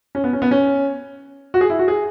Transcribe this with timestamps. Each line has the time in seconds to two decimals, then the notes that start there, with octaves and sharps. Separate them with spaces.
0.15 C#4
0.24 B3
0.33 C#4
0.42 B3
0.51 C#4
1.54 F#4
1.61 G#4
1.70 E4
1.79 F#4
1.88 G#4